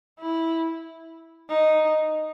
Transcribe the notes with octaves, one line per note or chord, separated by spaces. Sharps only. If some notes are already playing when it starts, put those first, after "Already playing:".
E4
D#4